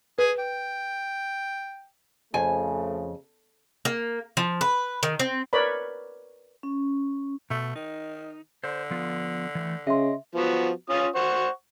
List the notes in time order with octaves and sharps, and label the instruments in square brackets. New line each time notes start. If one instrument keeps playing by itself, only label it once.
[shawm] G#4 [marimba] B4
[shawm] G5
[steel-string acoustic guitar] F2 [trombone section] C#3 F3 A3 [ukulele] G#5
[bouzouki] A#3
F3
B4
D#3
C4
[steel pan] A#4 B4 C#5 D5 A#5 B5
[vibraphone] C#4
[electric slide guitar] B2 [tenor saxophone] A3
[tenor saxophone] D#3 [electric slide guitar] D#4
[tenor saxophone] D3 [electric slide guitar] C5
[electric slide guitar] F3 B3 F4
E3 A3
[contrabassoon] C#3 [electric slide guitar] D#5 [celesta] E5 C6
[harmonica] F3 B3 F#4
C#4 F4 D#6
C5 F#5 C#6